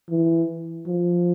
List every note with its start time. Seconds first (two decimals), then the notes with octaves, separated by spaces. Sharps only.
0.09 E3
0.87 F3